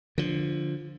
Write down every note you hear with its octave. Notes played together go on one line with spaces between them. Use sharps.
D3 F3